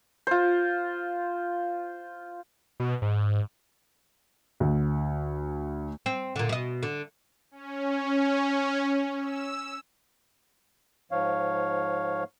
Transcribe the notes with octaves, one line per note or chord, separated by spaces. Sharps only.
F4 C5
B2
G#2
D2
C4
A#2 D3
B2 D#5
D3
C#4
E6
G#2 F3 C#5 F5